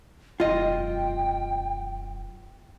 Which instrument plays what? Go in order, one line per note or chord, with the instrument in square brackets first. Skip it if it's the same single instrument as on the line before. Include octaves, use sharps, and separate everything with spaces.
[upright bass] E1 F#2 [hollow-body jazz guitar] F4 D#5 [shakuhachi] G5